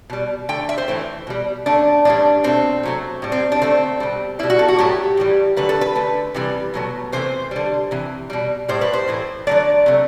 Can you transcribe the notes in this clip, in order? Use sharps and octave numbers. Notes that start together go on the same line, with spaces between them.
B2 G3
D3 A3 G5
E5
C5
A2 E3 A3
B2 G3
D3 A3 D4
A2 E3 G3 D4
B2 A3 C4
C3 F#3 A3
A2 G3
C4
D4
D3 A3 C4
B2 G3
B2 G3 E4
F#4
A4
F#4
A2 F#3 A3 G4
A2 E3 G3
D3 F#3 A3 B4
A4
B4
D3 A3
C3 E3 G3
B2 F#3 A3
C3 E3 A3 C5
D3 G3
C3 E3
B2 G3
A2 G3 C5
B4
C5
A2 E3 A3
D3 F#3 A3 D5
C3 F#3 A3